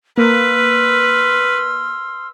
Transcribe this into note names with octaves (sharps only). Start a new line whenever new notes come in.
A#3 B4 C6 E6 F6